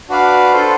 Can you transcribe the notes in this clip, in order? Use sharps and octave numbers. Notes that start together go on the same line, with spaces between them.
D4 F#4 B4 D5 F5
D4 F4 A4 C5